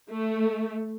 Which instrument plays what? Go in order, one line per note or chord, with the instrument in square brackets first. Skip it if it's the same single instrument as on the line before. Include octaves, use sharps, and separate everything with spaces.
[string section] A3